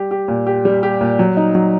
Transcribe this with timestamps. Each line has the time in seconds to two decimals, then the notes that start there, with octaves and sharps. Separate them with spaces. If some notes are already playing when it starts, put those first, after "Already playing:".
Already playing: G3 G4
0.11 G4
0.28 A#2
0.47 G4
0.65 G3
0.83 G4
1.01 A#2
1.19 F#3
1.37 D#4
1.55 F#3